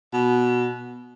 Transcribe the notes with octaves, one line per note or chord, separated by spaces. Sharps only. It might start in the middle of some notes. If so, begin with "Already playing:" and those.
B2